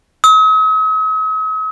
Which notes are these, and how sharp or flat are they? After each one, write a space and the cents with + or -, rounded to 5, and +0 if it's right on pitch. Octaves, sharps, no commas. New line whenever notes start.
D#6 +45